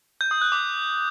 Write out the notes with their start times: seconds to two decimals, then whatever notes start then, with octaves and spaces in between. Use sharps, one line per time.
0.21 G6
0.31 D#6
0.41 F#6
0.52 D6